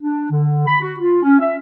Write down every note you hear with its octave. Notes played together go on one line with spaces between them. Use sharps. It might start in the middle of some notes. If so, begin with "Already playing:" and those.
D4
D3
B5
F#4
F4
C#4
E5